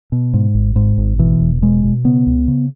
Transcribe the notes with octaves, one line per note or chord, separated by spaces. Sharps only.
B2
G#2
G#1
G#2
G#1
B2 E3
E1
B2 G#3
B2
C#3 B3
C#2
C#3